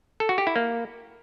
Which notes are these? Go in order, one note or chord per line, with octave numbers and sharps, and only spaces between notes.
A4
F#4
G4
E4
A#3